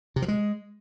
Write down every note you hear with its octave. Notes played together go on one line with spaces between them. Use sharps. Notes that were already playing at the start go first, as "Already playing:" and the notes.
C3
F3
G#3